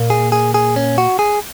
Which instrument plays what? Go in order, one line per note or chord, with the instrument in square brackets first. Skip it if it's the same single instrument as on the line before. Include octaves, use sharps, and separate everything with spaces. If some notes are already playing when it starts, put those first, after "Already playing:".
Already playing: [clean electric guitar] A#2 A#3
G#4
G#4
G#4
C#4
F#4
G#4